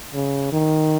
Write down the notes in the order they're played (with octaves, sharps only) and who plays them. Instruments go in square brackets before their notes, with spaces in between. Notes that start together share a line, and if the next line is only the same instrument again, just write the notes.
[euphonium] C#3
D#3